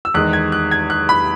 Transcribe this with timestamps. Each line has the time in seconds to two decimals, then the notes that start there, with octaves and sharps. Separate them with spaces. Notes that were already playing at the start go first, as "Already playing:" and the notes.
0.05 E6
0.14 E2 D#3 G#3 F#6
0.33 G#6
0.52 F#6
0.71 G#6
0.90 F#6
1.09 B5